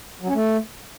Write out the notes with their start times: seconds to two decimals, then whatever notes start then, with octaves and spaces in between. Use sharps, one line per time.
0.22 F#3
0.28 C#4
0.34 A3